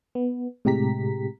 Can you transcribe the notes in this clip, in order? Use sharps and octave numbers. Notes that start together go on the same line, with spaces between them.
B3
A2 C3 G#3 G4 A#5 B6